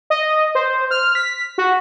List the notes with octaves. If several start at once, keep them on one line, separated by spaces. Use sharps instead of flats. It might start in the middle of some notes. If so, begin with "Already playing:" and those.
D#5
C5
F6
B6
F#4